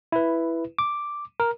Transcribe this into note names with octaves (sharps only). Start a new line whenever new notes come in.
E4 B4
D6
A#4